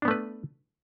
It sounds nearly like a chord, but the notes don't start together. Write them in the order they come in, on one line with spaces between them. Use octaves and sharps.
D4 B3 A3 B4